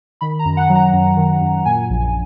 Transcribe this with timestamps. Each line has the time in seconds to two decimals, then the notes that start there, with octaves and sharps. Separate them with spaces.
0.21 D#3 B5
0.39 A#5
0.45 F#2
0.57 F#5
0.69 F#3
0.75 A#5
0.93 F#2
1.17 D#3
1.41 F#2
1.65 A#2 G#5
1.90 A#1